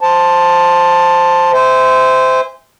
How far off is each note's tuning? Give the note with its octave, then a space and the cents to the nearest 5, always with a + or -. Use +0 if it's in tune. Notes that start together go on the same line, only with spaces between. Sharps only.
C5 +0 A5 +5
C5 -20 E5 -20 G#5 -35